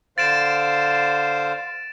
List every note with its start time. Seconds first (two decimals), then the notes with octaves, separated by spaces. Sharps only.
0.18 D3 C5 F5 A6 D7 E7